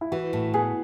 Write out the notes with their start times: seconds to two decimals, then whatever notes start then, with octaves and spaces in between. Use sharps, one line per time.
0.01 E4
0.12 E3 F#4
0.33 A2
0.53 B3 G#4